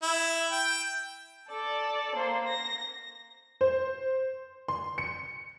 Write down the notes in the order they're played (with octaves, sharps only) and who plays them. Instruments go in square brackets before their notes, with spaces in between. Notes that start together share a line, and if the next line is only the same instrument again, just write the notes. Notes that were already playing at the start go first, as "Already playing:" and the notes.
[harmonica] E4
G5
[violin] A4 D5
A#3 C5
A#6
[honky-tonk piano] C5
C6
C#7